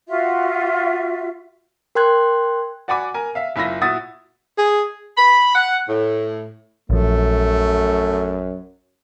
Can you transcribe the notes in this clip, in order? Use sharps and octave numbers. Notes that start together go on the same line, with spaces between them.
F4 F#4 E5
A#4 G5 C6 F#6 G#6
F#4 D5 F#5 G#5 B5 D6
A#4 G#5
E5 F5
F#1 E4 F4 B5 A#6
A#2 E4 F#4 D#6 A6
G#4
B5
F#5
A2
A#1 F#2 F3 A3